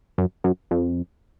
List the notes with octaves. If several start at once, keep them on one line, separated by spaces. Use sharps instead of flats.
F#2
F#2
F2